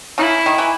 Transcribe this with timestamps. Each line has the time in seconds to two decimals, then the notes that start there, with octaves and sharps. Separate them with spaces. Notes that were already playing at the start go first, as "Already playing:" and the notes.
0.18 C#3 E4
0.46 D#3
0.58 E3